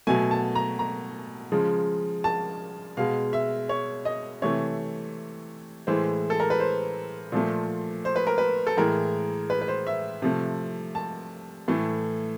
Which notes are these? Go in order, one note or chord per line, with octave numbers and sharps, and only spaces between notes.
B2 F#3 A3 G#5
A5
A#5
A#5
C#3 F3 G#3
A5
B2 G#3 F5
E5
C#5
D#5
C3 E3 A3 C#5
A2 E3 G#3 C5
A4
A#4
B4
C5
A#2 F3 A3
C5
B4
A#4
B4
A4
A2 E3 G#3 A#4
B4
B4
C5
E5
C3 F3 A3
A5
A2 E3 A3